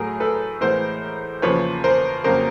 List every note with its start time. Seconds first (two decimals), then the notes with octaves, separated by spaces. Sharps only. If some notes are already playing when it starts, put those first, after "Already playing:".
Already playing: A2 F#3 A3 G#4 A#4
0.20 A4 B4
0.61 A2 E3 G#3 B3 A#4 C5
1.42 E2 C#3 F3 A#3 B4 C#5
1.84 A#4 C5
2.24 F2 C#3 F#3 A#3 A#4 C5